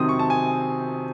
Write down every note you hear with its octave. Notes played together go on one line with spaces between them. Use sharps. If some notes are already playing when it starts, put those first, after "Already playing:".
Already playing: C3 D#3 F#3 C4 D#6
C#6
A5
G#5